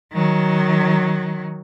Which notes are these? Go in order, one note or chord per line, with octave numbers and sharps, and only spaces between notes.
D#3 F#3